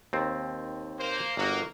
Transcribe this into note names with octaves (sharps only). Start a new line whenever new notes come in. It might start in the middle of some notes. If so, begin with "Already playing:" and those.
D#2 C4
A#3 C5
G1 A#3 F#4